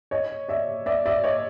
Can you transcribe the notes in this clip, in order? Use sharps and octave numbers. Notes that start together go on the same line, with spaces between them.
C#5 D#5
D5 E5
D5 E5
D5 E5
C#5 D#5